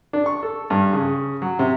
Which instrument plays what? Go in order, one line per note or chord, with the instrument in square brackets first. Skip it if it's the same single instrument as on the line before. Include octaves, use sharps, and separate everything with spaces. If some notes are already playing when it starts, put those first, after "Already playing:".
[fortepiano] D4
C#6
A4
G2
C#3
F#3
C3